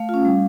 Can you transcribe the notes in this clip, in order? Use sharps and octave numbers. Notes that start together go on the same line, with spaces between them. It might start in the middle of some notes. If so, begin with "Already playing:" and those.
Already playing: A3 F5
C#4 F4
G3